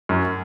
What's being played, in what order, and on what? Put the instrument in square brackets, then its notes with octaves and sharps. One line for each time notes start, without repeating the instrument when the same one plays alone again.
[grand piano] F#2